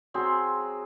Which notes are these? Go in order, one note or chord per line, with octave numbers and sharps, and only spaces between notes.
F#3 C4 G#4 C6